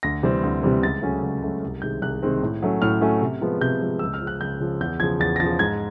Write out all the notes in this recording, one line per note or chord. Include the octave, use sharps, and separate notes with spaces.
D2 A#6
C3 E3 G3 C4
D2
C3 E3 G3 C4
C#2 A6
C#3 F#3 A3 C#4
C#2
C#3 F#3 A3 C#4
C2
C3 D#3 G#3 C4 G6
C2 F#6
C3 D#3 G#3 C4
A2
F#3 A3 C#4
A2 F6
F#3 A3 C#4
C3
F3 G#3 B3
C3 G6
F3 G#3 B3
C#2 E6
F6
C#3 F3
F#6
C#2 G6
C#3 F3
E2 G6
C#3 F3 G#6
E2 A6
A#6
C#3 F3 A6
G#2 G#6